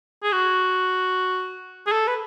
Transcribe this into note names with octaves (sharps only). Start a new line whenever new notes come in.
G#4
F#4
G#4
A4
B4